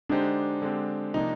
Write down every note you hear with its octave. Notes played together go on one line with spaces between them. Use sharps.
D3 G#3 D4 D#4 G4 C5
D3 G#3 C4 G4
C3 F3 A#3 D4 D#4